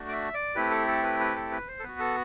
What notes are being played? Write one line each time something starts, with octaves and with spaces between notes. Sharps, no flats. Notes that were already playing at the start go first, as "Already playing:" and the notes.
Already playing: A3 D4 F#4
D5
E5
D5
A3 C4 E4 G4 B4
A4
A4
B4
B4
A4
B4
C5
A4
B3 F#4 B4
A4